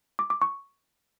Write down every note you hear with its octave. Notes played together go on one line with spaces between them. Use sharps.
D6
D6
C#6